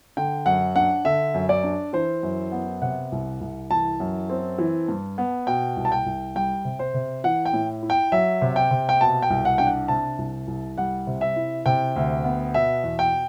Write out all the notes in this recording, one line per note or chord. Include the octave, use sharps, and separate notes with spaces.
D3 G5
F#2 F#5
D4 F#5
D3 E5
F#2
D5
D4
E3 C5
F#2
B3
C3 F#5
C2
C2
E3 A5
F#2
C4
E3
G2
B3
B2 G5
C2
A5
G5
C2
G3 G5
C3
C5
C3
E3 F#5
G5
A2
E4
G5
F#3 E5
C3
G5
C3
G5
B2 A5
G5
C2
F#5
D4 G5
F#5
C3 A5
C2
C2
G3 F#5
C3
E5
E4
C3 G5
D2
B3
B2 E5
E2
G5